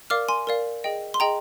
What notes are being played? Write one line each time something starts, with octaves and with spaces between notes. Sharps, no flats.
A#4 D5 F5 D6 F6
G#5 C6
A#4 D5 F5
G#4 D#5 G5
C6
G#4 D#5 G5 A#5